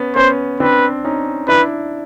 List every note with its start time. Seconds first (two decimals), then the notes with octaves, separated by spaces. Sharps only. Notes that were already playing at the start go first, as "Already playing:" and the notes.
Already playing: B3 C#4
0.16 B3 C#4 C5
0.60 C4 D4 B4
1.04 C#4 D#4
1.49 D4 E4 B4